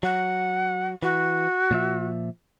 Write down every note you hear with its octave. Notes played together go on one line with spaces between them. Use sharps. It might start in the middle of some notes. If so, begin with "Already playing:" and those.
F#3 F#5
E3 F#4
A#2 F3 E5